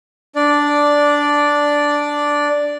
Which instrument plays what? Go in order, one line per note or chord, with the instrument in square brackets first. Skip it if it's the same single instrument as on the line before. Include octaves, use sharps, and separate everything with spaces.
[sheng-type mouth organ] D4 D5